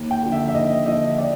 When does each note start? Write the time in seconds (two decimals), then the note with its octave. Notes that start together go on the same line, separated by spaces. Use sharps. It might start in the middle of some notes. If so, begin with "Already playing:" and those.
Already playing: D#2
0.11 G5
0.22 D3 F3
0.32 E5
0.48 E5
0.54 D#2 D#5
0.86 D3 F3 D#5
1.18 D5